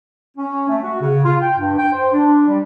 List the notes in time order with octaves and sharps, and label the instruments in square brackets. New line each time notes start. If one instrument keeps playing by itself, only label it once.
[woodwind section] C#4
A3
F#4
C#3
F4
G5
G2
G5
C5
D4
G3